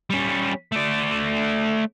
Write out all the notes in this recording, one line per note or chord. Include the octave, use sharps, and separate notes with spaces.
G3 C#4
A3 D5